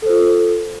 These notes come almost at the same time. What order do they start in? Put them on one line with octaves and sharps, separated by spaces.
A4 C5 F4